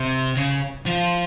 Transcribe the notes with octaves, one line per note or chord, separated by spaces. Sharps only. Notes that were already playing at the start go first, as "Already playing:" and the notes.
Already playing: C3
C#3
F3